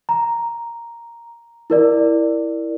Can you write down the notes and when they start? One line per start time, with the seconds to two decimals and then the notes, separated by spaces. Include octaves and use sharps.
0.09 A#5
1.70 E4 A#4 D5